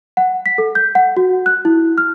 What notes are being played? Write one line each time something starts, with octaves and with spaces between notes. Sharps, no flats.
F#5
B6
A4
G6
F#5
F#4
F#6
E4
F6